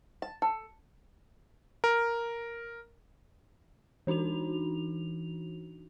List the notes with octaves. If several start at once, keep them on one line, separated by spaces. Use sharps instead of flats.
A5
A4
A#4
E3 D4 D#4 F#4 F7